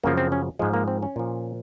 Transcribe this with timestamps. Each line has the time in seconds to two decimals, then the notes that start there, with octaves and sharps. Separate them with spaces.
0.04 F#2 C#3 F3 A#3
0.17 C4
0.32 C#4
0.59 G#2 F3 G#3
0.74 A#3
0.88 C4
1.03 C#4
1.16 A#2 F3